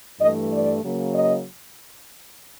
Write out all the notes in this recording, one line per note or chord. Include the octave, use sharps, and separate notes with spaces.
G2 E3 A3 D#5
D5
C#3 F#3 A#3
D#5